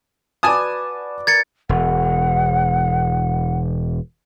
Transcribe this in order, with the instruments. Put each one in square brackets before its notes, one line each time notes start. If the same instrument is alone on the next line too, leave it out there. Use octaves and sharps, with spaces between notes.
[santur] F#4 B4 D5 [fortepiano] G#5 A5 D#6
[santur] A#4 [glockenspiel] G#6 A6 C#7
[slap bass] E1 [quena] F#5